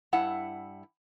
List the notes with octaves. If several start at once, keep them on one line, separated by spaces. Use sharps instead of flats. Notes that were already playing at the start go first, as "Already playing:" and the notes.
G2 E4 F#5